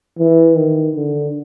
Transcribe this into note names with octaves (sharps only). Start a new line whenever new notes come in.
E3
D#3
D3